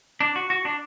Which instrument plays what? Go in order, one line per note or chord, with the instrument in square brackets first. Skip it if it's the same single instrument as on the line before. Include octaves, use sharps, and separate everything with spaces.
[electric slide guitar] D4
F#4
F#4
D4